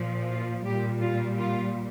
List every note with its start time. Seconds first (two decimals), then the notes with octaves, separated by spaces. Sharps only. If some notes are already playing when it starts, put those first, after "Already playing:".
Already playing: A#2 F3
0.29 F4
0.66 A#2 G3 G4
1.01 F4
1.37 F4